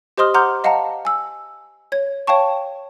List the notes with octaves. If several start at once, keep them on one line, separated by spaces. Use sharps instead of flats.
G4 C5 D#5 C6 D#6 F6
F#5 A#5 C6 D6 F6 G6
D#5 F5 F#5 A5 A#5
G#5 E6
C#5 G#6
C#5 F5 G5 A5 C#6